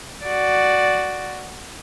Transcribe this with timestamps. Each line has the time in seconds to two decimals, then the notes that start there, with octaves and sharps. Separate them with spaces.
0.25 F#4 D5